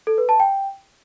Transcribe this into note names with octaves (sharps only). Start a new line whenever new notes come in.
A4
B4
A5
G5